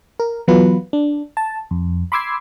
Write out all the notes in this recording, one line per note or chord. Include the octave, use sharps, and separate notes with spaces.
A#4
E3 F#3 B3 F4 B4
D4
A5
F2
B5 C6 D6 E6 G#6 C7